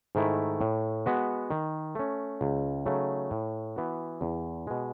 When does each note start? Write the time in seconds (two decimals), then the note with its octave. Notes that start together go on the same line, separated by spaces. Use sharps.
0.15 G#2 D#3 A3 E4
0.61 A2
1.06 G#3 B3 F#4 B4
1.51 D#3
1.95 A3 C#4
2.41 C#2
2.86 C#3 F#3 A3 D#4
3.31 A2
3.76 E3 B3 F#4
4.21 E2
4.67 B2 G#3